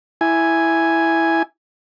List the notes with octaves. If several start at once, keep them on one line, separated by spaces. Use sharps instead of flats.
E4 G#5